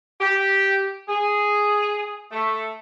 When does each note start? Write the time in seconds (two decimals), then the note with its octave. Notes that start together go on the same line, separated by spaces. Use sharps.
0.21 G4
1.09 G#4
2.32 A3